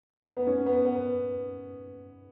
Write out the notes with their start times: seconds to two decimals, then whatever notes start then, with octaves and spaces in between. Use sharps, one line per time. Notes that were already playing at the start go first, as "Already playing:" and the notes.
0.37 B3
0.47 C#4
0.66 B3
0.85 B3